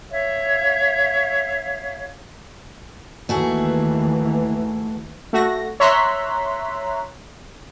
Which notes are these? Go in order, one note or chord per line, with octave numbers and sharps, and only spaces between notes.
C#5 E5 F5
D#2 E3 A3 F#4 G#4
A3 F#4 A#6
C#5 E5 A#5 C6 F#6 B6